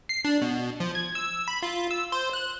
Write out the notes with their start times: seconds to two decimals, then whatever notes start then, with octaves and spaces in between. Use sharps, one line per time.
0.09 C7
0.25 D4
0.42 B2
0.80 F3
0.95 G#6
1.15 E6
1.48 B5
1.63 F4
1.91 E6
2.12 C5
2.33 F#6